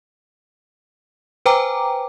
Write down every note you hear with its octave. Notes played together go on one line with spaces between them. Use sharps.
B4 C5 G5 G#5 A#5 D6